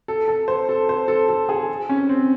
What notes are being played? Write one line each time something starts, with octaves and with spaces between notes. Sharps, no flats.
A4
A4
C5
A4
C5
A4
A4
G#4
C#4
C4